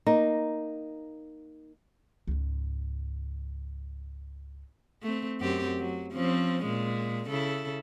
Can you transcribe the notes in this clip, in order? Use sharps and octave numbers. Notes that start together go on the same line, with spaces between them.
A#3 D#4
C#2 G#2
A3 C4
F#2 C4 G4
F#3
F3 C4 C#4
A#2 G#3
C#3 E4 A4